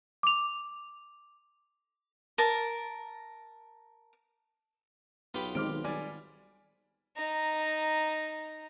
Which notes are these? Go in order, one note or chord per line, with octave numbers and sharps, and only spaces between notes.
D6 F7
A#4 A5
B1 B3 F4 G4 B5
D#3 G#3 C4 D6 F6 D7
G3 D5 G#5
D#4 A#5